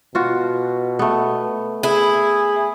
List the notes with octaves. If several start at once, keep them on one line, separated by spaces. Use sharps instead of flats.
B2 F4 F#4
A3 B3
E4 G#4